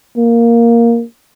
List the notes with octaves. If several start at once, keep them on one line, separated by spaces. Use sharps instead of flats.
A#3